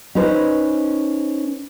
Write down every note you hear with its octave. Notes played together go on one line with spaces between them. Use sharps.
C#4 D#4 B4 C5